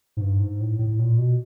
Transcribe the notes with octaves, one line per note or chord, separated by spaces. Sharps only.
G#2
G2
G#2
A2
A2
A#2
B2